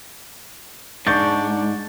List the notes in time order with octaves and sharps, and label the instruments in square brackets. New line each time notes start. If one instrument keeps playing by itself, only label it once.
[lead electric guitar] G#2 [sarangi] D4 [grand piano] C#6 G6 A6